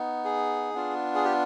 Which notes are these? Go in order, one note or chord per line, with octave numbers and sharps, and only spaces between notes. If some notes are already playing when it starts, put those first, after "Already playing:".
Already playing: B3 D#4
G#4
B3 D4 F4
G#4
G4